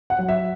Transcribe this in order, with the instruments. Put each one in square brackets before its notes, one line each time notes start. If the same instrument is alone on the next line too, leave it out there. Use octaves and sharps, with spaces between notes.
[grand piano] F#5
F#3
E5